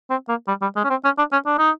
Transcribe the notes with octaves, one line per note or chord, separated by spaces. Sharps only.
C4
A#3
G3
G3
G#3
C#4
C4
C#4
D4
C#4
D4
D#4